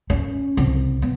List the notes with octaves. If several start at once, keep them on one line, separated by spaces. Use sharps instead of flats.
C#4
C2
B3